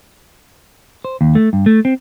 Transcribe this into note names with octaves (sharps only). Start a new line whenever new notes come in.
C5
D#2
A3
G2
A3
C4